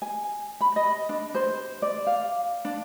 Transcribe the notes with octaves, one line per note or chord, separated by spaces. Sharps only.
G#5
B5
D#5
D4
C5
D5
F5
D4